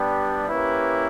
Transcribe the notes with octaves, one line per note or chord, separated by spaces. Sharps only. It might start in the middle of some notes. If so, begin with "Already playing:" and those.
Already playing: G3 B3 D4 G4
A#3 C#4 E4 G4 B4